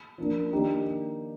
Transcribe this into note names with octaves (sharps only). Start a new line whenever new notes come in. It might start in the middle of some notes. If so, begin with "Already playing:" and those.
F3 A#3 D4
D#3 A#3 D4 D#4 G4